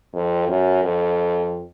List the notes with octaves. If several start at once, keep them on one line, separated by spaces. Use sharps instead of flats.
F2
F#2
F2